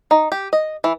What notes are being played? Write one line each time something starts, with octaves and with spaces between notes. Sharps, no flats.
D#4
G4
D#5
E3